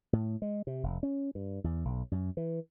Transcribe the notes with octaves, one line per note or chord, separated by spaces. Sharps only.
A2
G#3
C3
F1
C#4
G2
E2
B1
F#2
E3